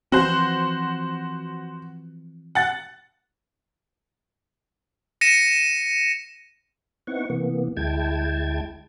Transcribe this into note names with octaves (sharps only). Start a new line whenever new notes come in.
E3 F3 C4 F#4 C5
F#5 A6
A#6 C#7 D#7 E7
B3 C4 D#4 E4 F#5 C#6
C3 E3 A#3 B3
D2 G#3 E4 G5 A5 G#6